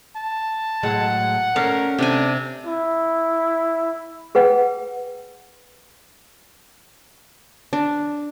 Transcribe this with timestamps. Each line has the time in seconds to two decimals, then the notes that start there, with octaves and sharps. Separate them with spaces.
0.16 A5
0.83 A2 F#3 G#3 F#5
1.56 A3 C#4 A#4 D5 F5
1.99 C3 D4 G#5
2.67 E4
4.35 G#4 B4 F#5 G5
7.73 D4